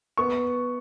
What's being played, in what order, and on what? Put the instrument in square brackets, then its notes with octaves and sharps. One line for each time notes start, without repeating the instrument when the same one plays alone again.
[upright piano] B3 C#6